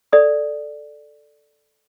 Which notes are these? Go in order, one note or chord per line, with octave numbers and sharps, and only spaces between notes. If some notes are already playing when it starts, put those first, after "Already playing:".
A4 D5 D#6